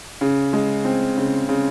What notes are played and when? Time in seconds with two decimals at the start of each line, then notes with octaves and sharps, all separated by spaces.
0.21 C#3
0.53 G#3
0.85 C4
1.17 C#3
1.49 C#3